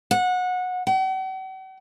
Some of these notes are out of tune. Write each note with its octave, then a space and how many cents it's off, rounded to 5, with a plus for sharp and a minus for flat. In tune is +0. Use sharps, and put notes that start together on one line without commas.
F#5 -20
F#5 +45